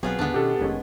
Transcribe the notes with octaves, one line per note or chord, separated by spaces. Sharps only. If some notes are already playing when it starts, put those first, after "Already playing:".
B1 F#3 B3 C4 F4 G#4 B4
D#2 G#2 D3 B3 D4
B2 D#3 C#4 G4 A4
F1 D#3 G#3 C#4